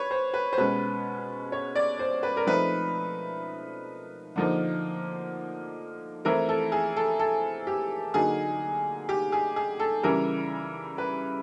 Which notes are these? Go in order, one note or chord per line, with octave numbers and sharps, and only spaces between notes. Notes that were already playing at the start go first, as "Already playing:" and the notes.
Already playing: B4 C#5
C5
B4
C5
B2 G#3 C#4 B4
C#5
D5
C5
B4
A#4
F3 A3 C4 D#4 B4
D3 F3 A#3 D#4
E3 A3 C4 E4 A#4
A4
G#4
A4
A4
G4
D3 F#3 A#3 D#4 G#4
G4
G#4
G#4
A4
C#3 E3 G3 A#4
B4